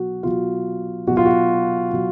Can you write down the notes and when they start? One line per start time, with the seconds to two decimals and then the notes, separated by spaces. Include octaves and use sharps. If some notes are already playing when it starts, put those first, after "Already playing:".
Already playing: B2 F#3 F#4
0.23 B2 F#3 F4
1.07 B2 F#3 F#4
1.17 F4
1.25 F#4
1.92 B2 F#3